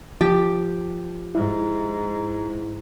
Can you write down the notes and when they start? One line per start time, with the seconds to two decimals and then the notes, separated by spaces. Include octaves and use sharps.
0.21 F3 G4
1.35 G#2 E4